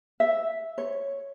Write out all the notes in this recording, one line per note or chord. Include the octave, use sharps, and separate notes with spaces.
E5
C#5